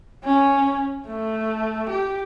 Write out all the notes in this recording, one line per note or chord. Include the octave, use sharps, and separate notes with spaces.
C#4
A3
G4